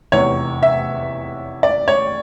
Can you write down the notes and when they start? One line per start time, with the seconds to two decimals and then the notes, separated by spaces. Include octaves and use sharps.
0.12 F1 E2 C3 C#5
0.63 E5
1.63 D5
1.88 C#5